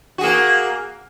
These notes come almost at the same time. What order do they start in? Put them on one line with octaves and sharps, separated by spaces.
F#4 G#4 A#3